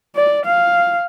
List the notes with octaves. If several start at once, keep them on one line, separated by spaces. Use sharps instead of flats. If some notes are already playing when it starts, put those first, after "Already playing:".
D5
F5